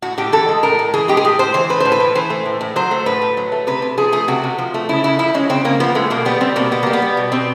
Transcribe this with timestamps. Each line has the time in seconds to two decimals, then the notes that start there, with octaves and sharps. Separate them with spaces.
0.02 A2 F#4
0.18 A2 G4
0.32 E3 A4
0.49 G#3
0.63 A2 A#4
0.79 A2
0.94 E3 G#4
1.08 G#3 G4
1.17 G#4
1.24 A2 G4
1.39 A2 C5
1.54 E3 C5
1.69 A3 B4
1.80 A2 C5
1.92 B4
2.00 A2
2.15 E3 C5
2.30 A3
2.45 A2
2.61 A2
2.76 F#3 C5
2.91 A3
3.06 A2 B4
3.22 A2
3.37 F#3
3.52 A3
3.67 C3 B4
3.82 C3
3.97 F3 G#4
4.12 A3 G#4
4.28 C3 F#4
4.44 C3
4.58 F3
4.74 A3
4.89 C#3 E4
5.04 C#3 E4
5.19 F3 E4
5.34 G#3 C#4
5.49 C#3 C4
5.65 C#3 A#3
5.80 F3 B3
5.95 G#3 A3
6.10 B2 A#3
6.25 G3 B3
6.41 G3 C4
6.56 B2 A#3
6.71 B2 B3
6.83 G3 A#3
6.93 B3
7.02 G3
7.17 B2
7.32 B2 C4